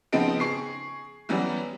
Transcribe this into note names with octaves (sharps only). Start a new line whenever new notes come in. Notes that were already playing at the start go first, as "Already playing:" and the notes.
C#3 F3 B3 C4 D#4 D7
G#4 C#6 C7
E3 F#3 G3 B3 C#4